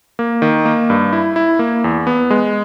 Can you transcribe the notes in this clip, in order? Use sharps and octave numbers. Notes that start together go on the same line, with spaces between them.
A#3
D#3
A#3
G2
E4
E4
A#3
E2
B3
G#3